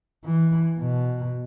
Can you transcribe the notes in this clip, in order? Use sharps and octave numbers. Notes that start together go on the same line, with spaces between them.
E3
B2